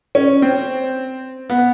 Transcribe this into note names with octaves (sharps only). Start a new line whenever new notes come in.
C#4
C4
B3